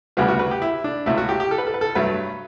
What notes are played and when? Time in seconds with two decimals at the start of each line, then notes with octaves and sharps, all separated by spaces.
0.17 D2 C#3 G3 B3 F#4
0.28 F#4
0.39 B4
0.51 G4
0.62 E4
0.84 D4
1.06 C#2 B2 A3 E4
1.18 F#4
1.29 G4
1.40 G4
1.51 A4
1.58 B4
1.67 A4
1.74 B4
1.81 A4
1.95 G2 F#3 A3 B4